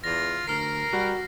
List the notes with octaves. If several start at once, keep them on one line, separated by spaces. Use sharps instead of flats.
E2 F4 A#6
D2 A#4 F6 C7
G3 F#4